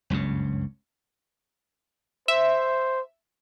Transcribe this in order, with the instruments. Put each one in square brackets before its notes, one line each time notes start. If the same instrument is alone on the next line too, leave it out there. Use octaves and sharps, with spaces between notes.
[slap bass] F#1 C#2 G2 C#3
[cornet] C5 [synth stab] E5